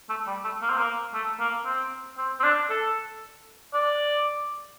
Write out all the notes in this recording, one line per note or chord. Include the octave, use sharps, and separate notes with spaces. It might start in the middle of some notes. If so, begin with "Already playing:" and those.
A3
G3
A3
A#3
C4
A#3
A3
A#3
C4
C4
C4
D4
A4
D5